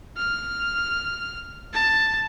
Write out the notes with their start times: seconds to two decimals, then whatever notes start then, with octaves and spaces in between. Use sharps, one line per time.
0.17 F6
1.74 A5